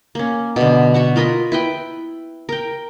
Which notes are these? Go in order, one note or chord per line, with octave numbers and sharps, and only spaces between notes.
A#3 C#4
B2 D3
F#4 E5 F#5
F4 A#4 D#5 B5
E4 B4 G5
A#4 G5